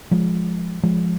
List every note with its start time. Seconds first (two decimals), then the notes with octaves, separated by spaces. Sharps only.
0.11 F3 G#3
0.83 F3 G#3